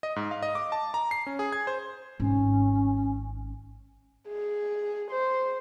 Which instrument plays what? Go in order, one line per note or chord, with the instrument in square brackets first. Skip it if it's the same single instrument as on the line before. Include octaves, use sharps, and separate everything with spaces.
[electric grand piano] D#5
G#2
F5
D#5
D6
A5
A#5
C7
C#4
G#4
G#6
C5
[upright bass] G#1 [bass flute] C#4
[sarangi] G#4
C5